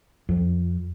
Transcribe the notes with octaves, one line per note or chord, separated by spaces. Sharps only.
F2